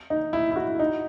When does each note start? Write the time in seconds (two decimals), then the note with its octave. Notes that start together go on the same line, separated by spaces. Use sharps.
0.10 D#4
0.33 E4
0.51 E4
0.56 F#4
0.79 D#4